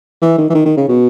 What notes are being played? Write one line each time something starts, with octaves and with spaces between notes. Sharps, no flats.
E3
D#3
E3
D#3
D#3
C#3
B2